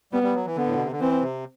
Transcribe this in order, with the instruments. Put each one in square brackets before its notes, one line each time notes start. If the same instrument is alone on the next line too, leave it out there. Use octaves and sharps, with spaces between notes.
[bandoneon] G3 [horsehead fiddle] B3
[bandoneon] G3
F#3
E3
[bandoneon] D3 [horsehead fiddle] B3
[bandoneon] A2
B2
C3
D3
[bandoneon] E3 [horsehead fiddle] C4
[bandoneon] C3